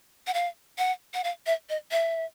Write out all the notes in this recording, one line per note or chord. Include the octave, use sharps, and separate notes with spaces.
F#5
F5
F#5
F#5
F5
E5
D#5
E5